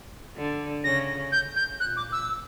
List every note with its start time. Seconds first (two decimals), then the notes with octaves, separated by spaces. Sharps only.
0.36 D3
0.84 C#3 A#6
1.32 G6
1.56 G6
1.80 A#2 F#6
1.97 D6
2.12 E6